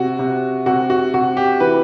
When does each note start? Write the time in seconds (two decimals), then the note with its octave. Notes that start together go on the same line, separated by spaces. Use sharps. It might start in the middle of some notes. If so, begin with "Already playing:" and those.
Already playing: C3 F#4
0.19 C3
0.66 C3 F#4
0.90 F#4
1.14 C3 F#4
1.37 G4
1.60 E3 B4